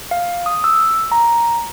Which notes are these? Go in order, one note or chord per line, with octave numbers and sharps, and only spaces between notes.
F5
D#6
E6
A#5